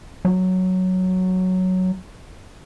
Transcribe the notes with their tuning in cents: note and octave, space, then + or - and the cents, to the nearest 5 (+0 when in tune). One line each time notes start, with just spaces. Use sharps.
F#3 +0